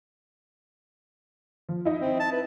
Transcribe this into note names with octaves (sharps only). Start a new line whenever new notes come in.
F3
D#4 E4
C4
A5
B4